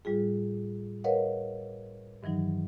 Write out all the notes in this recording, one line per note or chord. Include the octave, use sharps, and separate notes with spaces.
A2 G3 F4 G#4
A#4 B4 C#5 D#5 F5 F#5
G2 D#3 E3 F#3 D#4